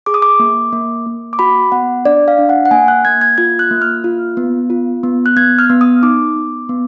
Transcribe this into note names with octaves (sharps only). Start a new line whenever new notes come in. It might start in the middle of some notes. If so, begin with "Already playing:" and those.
G#4 D6
D#6
D6
A#3
A#3
A#3
D6
F#4 B5
B3 F#5
D4 D5
F5
D4
F#5
F#5
A#3 G#5
F#6
A#3 G#6
G#6
F4 G#6
F#6
A#3
F6
F4
B3
F4
B3
F#6
B3 G#6
F6
B3
D#6
D#4 D6
B3
B3